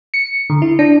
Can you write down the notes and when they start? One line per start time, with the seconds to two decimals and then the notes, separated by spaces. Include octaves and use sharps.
0.14 C#7
0.50 D3
0.62 E4
0.79 D4